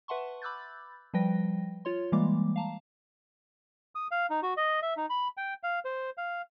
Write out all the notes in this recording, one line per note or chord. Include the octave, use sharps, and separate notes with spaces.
B4 E5 F#5 A5 C6 C#6
B5 D6 E6 F#6 G6 A6
F3 G3 B4 G5 A#6
F4 C#5 C6
E3 G3 G#3 A#3 D6
F5 A5 A#5
D#6
F5
D#4
F#4
D#5
E5
D#4
B5
G5
F5
C5
F5